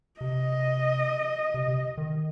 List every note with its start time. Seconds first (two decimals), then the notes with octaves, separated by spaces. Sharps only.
0.21 C3 D#5
1.54 C3
1.68 C3
1.98 D#3